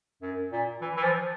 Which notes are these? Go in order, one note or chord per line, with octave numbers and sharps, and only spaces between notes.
F#2
A#2
E3
E3
F3